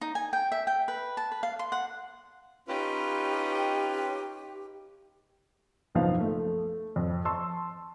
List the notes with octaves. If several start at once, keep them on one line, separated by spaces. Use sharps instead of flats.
D#4
G#5
G5
E5
G5
B4
A5
B4
F5
C6
F#5
C#4 D#4 F4 G4 B4 G5
F#1 B1 F3 B3 F5
A3
F2
A5 C6 C#6 E6